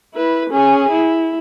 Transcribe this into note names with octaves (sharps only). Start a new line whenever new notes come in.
E4 B4
C#4 G#4
E4